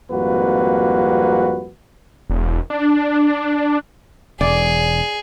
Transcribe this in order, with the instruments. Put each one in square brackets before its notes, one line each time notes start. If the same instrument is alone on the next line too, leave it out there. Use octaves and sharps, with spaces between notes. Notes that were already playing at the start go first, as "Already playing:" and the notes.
[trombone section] G#1 F2 G3 A#3 F#4 B4
[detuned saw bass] E1
D4
[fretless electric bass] E1 [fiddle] G#4 [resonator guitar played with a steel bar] D5